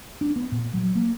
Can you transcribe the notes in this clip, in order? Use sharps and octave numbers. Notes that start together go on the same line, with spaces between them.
D4
B3
A#2
F#3
A#3